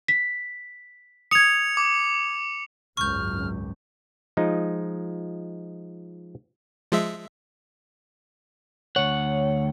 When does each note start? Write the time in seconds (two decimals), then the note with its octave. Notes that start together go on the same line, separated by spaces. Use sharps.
0.08 B6
1.31 D#6 G#6 C#7 F7
1.77 D6
2.97 G#1 C#2 F#2 C#6 F6 G6
4.37 F3 G#3 D#4
6.92 F3 G#3 E5
8.96 D2 C#5 F#5